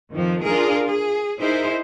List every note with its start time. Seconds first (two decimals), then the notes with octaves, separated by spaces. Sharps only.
0.12 F2 D#3 F3
0.45 D4 F4 G#4 A#4
0.86 G#4
1.40 D#4 E4 G#4 A#4 C5